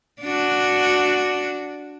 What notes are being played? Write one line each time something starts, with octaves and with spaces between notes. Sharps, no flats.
D4 F#4